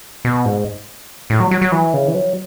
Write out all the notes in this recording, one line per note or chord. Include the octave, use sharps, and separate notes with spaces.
B2
G#2
A2
F#3
F#3
F#3
E3
C#3
E3
F#3